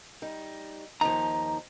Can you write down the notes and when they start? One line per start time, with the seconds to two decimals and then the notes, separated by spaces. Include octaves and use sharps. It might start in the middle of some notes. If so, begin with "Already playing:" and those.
0.22 G3 D#4
1.01 D#2 F3 D#4 A#5